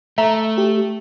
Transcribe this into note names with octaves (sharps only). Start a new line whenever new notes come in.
A3 E5 A#5
G4